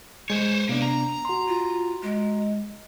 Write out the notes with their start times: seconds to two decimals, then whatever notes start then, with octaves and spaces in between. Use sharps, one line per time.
0.30 G#3 C5 C#5
0.69 C3 A#3 B3 D4
0.82 A#5
1.25 F#4 C6
1.48 F4
2.03 G#3